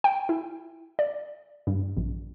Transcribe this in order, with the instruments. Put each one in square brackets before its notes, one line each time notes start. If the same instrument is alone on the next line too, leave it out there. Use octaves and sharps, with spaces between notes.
[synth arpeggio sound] G5
E4
D5
G2
A#1